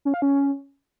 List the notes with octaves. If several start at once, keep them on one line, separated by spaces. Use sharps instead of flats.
C#4
F5
C#4